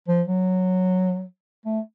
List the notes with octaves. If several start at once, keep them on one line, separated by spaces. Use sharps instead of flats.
F3
F#3
A3